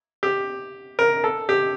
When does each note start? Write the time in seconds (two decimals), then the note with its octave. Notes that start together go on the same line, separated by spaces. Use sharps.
0.23 G4
0.99 A#4
1.24 A4
1.49 G4